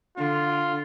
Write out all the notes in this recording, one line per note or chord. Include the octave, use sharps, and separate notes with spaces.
D3 F4